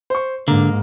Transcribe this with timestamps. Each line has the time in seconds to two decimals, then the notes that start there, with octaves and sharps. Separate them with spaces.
0.10 C5 C#6
0.48 G#2 D3 A#3